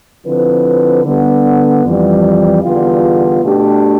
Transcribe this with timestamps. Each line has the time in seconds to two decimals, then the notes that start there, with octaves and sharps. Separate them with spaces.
0.25 D3 F3 C4 E4 B4
1.04 D3 G3 B3
1.84 F2 E3 G3
2.63 E2 D3 G3 B3 F4
3.42 B2 A3 D4 G4